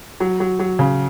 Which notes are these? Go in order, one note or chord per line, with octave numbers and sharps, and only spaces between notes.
F#3
F#3
F#3
C#3